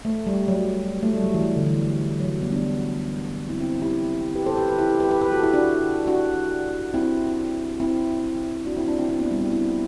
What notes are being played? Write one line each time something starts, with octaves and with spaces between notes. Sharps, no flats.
A3
G3
F#3
A3
G3
F#3
E3
D3
E3
F#3
G3 B3
B3 D4
C4 E4
C4 E4
E4 G4
G4 B4
A4 C5
G4 B4
G4 B4
E4 G4
G4 B4
G4 B4
G4 B4
G4 B4
F#4 A4
E4 G4
D4 F#4
D4 F#4
C4 E4
C4 E4
D4 F#4
C4 E4
D4 F#4
C4 E4
C4 E4
B3 D4
G3 B3
B3 D4
C4 E4